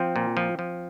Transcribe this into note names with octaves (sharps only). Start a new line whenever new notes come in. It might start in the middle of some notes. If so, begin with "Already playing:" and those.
Already playing: F3 C4
A#2
F3
F3